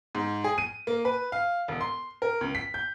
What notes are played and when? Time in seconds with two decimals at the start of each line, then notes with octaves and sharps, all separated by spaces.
0.15 G#2
0.44 G#4
0.58 D#7
0.87 A#3
1.05 B4
1.32 F5
1.68 E1
1.81 C6
2.22 A#4
2.41 C#2
2.55 B6
2.74 G6